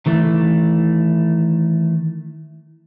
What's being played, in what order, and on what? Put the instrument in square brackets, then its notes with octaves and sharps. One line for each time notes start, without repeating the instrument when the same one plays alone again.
[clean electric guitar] D#3 E3 A3